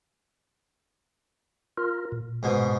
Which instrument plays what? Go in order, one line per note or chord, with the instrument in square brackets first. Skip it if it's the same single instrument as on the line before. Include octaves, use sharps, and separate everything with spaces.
[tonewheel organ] F4 A#4
A#2
[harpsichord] G#2 B2